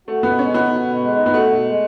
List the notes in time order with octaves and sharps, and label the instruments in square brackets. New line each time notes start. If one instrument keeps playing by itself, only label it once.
[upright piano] A3 [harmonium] F#4
[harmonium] B2 [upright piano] B3
[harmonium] G#3 [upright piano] C#4
[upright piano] B3 [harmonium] D#4
[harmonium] F#4
B2
G#3
D#4
[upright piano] B3
[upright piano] A3 [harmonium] F#4
[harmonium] B2
G#3